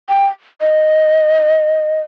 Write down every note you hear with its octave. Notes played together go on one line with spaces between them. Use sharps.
G5
D#5